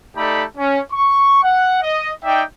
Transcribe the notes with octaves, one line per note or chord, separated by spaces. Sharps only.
A3 D#4 G4 A4 D5 B5
C#4
C#6
F#5
D#5
D#4 D5 E5 G5